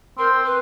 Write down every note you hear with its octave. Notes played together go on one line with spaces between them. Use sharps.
C4 A#4
B4